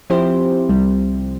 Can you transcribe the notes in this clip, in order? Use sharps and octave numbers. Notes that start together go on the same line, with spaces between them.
F3 C4 E4 G4 C5
C2 C3 G3